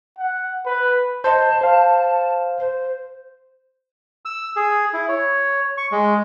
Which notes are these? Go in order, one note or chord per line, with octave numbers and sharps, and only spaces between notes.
F#5
B4
C5 D#5 A5
C5 F5
C5
E6
G#4
E4
C#5
C#6
G#3